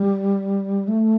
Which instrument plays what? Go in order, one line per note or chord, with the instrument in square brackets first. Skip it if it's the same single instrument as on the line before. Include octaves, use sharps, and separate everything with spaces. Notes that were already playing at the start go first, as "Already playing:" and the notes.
Already playing: [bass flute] G3
A3